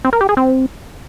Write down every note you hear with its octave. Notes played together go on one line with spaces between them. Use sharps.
C4
A#4
G4
G#4
C4